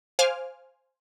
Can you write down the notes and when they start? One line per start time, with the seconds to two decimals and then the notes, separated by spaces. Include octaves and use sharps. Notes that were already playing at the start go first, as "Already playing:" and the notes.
0.19 C5 F5 G#5 D6 F6